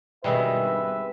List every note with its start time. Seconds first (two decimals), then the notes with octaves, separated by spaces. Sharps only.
0.24 G2 B2 D#3 G3 G#3 C4 B4 E5